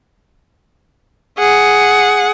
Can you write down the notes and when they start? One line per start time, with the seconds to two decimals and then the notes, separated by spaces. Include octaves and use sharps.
1.39 G#4 F#5